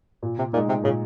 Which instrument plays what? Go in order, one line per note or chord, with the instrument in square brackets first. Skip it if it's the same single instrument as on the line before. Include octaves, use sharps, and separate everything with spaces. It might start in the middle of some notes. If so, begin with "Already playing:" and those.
[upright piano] A#2
[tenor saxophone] C3
[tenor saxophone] A#2 [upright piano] D#4
[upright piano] G#3
[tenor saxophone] C3
[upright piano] A#2 [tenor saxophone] C#3